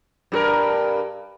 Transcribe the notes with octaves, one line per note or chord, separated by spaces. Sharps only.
G2 F#4 A#4